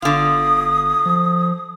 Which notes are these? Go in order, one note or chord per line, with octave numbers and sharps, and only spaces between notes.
G1 D3 F4 D#6
F3